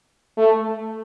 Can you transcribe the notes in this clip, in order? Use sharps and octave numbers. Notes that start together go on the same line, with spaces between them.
A3